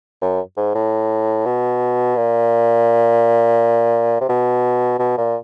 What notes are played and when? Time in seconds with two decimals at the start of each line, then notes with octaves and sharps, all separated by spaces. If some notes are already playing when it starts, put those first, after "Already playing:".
0.22 F#2
0.57 G#2
0.75 A2
1.46 B2
2.17 A#2
4.21 C3
4.29 B2
4.99 B2
5.17 A#2